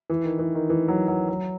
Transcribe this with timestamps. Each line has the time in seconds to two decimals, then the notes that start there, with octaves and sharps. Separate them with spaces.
0.10 E3
0.24 D#3
0.39 E3
0.55 D#3
0.70 E3
0.88 F#3
1.08 F#3
1.29 F#3